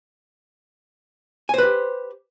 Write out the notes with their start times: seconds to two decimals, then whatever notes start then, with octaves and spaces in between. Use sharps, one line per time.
1.49 G#5
1.54 C5
1.58 B4
1.63 G4